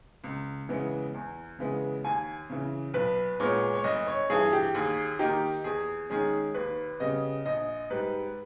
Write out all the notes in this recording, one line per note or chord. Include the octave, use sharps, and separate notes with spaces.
C#2
C#3 E3 G#3 B3
E2
C#3 E3 G#3 B3
D#2 G#5
C#3 E3
B1 B4
A#2 G#3 B3 C#5
C#5
G1 D#5
C#5
G2 E3 G#4
G4
D#2 G#4
D#3 A#3 D#4 G4
E2 G#4
D#3 G#3 C#4 G#4
D#2 B4
C#3 G3 B3 D#5
A#1 D#5
G#2 G3 B4